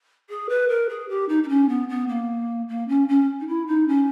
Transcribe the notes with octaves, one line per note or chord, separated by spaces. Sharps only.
G#4
B4
A#4
G#4
G4
D#4
D#4
C#4
B3
B3
A#3
A#3
C#4
C#4
D#4
E4
D#4
C#4